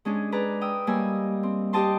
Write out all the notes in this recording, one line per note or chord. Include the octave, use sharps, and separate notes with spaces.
G#3 C#4 D4 G#4
G#4 B4 D5 A#5
G5 D#6 E6
G3 A#3 C#5 D#5 G#5 E6
C4
G4 C5 D#5 G5 A5 C6